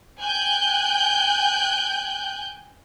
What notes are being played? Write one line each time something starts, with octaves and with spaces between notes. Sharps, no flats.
G5 G#5 F#6 G6